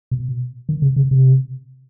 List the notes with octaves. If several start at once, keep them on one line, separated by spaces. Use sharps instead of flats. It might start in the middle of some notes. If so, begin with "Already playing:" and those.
B2
D#3
C#3
C#3
C3